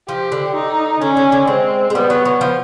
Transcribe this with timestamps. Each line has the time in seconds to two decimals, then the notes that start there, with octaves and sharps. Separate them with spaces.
0.08 F3 G4
0.32 D3
0.55 D#4
1.01 D3 C#4
1.17 D3
1.32 D3
1.47 G#3 C4
1.90 G#3
1.95 G3 B3
2.10 F#3
2.25 F#3
2.41 F3